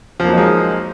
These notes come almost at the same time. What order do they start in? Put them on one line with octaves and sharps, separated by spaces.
F3 A#3 F#3 D#4 G#3